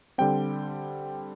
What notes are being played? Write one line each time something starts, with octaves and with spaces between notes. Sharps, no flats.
D3 G3 C4 G5